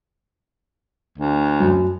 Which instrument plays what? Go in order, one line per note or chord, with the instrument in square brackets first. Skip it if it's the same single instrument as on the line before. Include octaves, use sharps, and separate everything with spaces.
[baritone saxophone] D2
[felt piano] F#2